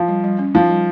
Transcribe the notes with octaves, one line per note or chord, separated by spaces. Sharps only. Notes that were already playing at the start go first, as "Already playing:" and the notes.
Already playing: F3
G3
G3
C#4
F3 D#4
G3